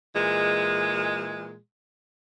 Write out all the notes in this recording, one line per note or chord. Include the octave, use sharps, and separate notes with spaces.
A#2 E3 G#3